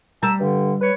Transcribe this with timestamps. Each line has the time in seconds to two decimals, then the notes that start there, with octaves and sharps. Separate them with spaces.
0.23 G3 A5 A#5 E6
0.40 G2 D3
0.81 B4 C#5